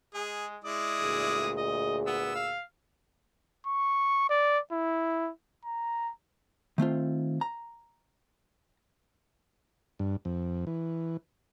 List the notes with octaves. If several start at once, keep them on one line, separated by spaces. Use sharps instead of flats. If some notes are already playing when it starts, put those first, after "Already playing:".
G#3 G#4
G#3 E4 D5 D#6
D2 A#2 G#4
D#5
B3 E6
F5
C#6
D5
E4
A#5
D#3 A3 C4 F4
A#5
G2
F2
E3